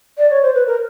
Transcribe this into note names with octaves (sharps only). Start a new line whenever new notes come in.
D5
C#5
C5
B4
A#4